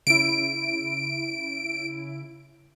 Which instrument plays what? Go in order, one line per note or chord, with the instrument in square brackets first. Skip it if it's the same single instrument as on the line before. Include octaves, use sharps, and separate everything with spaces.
[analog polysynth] C#3 E4 [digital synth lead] D7